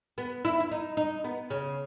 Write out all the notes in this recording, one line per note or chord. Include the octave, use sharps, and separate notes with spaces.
B3
E4
E4
D#4
D#4
B3
C#3